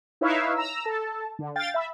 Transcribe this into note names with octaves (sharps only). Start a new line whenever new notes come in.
D#4 E4 B4 C#5 E5 F5
A#5 E6
A4 A5
D3
F5 G5 A6
E5 B5